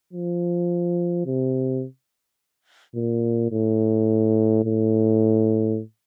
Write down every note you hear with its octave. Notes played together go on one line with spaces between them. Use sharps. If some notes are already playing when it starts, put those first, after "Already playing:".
F3
C3
A#2
A2
A2